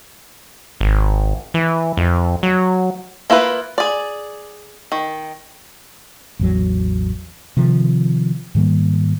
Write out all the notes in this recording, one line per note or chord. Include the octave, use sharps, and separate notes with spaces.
G#1
E3
F2
F#3
A#3 E4 F4 B4
G#4 D5
D#3
A1 E2 F#3
C3 D#3 F3
G#2 D#3 G3 A#3